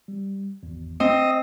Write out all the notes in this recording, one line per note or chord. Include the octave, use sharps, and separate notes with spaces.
G3
G#1 E2
C4 D#5 C#7